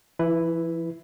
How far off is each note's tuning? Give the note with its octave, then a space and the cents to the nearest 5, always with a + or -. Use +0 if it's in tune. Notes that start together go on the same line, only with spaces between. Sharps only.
F3 -45 E4 +0 B4 +5